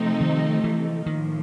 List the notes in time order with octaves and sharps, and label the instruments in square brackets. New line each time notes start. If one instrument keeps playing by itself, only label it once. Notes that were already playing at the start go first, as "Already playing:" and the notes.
Already playing: [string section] C3 F3 A3 C4 D#4
[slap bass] D#3
E3
[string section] A2 F3 A#3 [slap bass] D#3